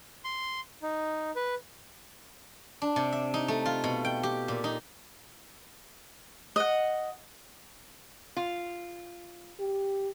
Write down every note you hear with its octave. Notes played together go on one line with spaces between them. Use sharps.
C6
D#4
B4
D4
C3
E5
D#4
A3
F4
B2
G5
G4
A#2
D#4
D#5 F#5
F4
G4